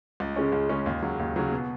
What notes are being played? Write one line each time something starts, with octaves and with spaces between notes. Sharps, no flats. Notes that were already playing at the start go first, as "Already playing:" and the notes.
C#2
C#3 G#3 C#4
C#2
C#3 G#3 C#4
D#2
C#3 F#3
D#2
C#3 F#3
B2